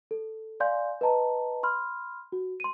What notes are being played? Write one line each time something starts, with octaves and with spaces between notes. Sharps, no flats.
A4
D5 F5 G#5 C6 G6
B4 D#5 A5 A#5
B5 C6 F6
F#4
C6 D#7